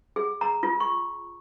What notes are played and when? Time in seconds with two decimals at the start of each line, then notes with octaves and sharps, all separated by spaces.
0.16 G#4
0.41 A#5
0.63 F4
0.80 C#6